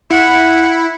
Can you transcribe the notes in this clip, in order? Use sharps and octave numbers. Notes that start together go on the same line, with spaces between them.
E4 F#5